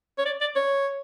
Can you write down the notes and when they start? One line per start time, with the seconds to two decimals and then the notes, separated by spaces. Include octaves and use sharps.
0.18 C#5
0.25 D5
0.41 D5
0.56 C#5